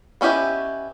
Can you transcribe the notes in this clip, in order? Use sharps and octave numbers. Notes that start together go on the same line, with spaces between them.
B3 C#4 E4 G4 D#5